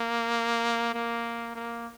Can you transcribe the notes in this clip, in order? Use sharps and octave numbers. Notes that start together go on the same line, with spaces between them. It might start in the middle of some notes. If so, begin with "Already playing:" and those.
Already playing: A#3
A#3
A#3